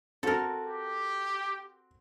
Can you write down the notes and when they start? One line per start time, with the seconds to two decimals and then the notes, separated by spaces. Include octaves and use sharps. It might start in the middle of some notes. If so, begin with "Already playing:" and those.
0.23 C4 F#4 A4 A#4
0.67 G4